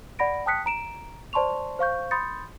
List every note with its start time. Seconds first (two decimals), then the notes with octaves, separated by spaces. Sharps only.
0.19 D5 F#5 B5 A#6 D7
0.46 G5 A5 D#6 F#6 B6 C#7
0.66 A#5 D7 E7
1.33 C5 D5 A5 C6 C#6 F7
1.79 C5 F5 C#6 G6
2.11 B5 C6 D#6 G6 A6 C#7